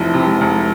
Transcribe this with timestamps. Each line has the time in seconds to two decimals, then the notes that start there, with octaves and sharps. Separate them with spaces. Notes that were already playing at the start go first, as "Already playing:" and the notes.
Already playing: F1 F2 C3 E3 F3
0.14 C3
0.27 G#3
0.41 F1